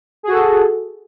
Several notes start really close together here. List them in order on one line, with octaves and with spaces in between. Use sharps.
G#4 F#4 A4